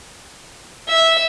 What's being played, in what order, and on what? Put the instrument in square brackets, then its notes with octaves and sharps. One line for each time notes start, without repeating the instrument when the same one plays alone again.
[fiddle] E5